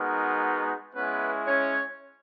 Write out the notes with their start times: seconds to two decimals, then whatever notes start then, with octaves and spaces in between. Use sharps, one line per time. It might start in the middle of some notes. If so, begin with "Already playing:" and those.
Already playing: G#3 B3 D#4 F#4 A#4
0.95 G#3 B3 C#4 E4 B4
1.47 C#4 C#5